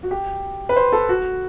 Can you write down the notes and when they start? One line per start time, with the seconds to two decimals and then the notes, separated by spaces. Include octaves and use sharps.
0.03 F#4
0.11 G4
0.69 B4
0.76 C5
0.92 A4
1.09 F#4